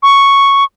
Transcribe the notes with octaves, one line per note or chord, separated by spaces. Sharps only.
C#6